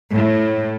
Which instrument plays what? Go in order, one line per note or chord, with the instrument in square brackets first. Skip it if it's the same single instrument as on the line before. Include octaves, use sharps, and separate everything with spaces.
[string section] A2